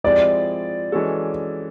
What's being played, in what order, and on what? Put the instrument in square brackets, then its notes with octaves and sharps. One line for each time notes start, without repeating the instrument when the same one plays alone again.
[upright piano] F3 G#3 C4 E4 G4 [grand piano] D5
[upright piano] E3 G#3 C#4 F#4 A4